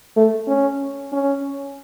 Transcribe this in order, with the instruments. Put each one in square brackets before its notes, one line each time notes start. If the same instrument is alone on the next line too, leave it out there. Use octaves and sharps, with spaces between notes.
[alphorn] A3
C#4
C#4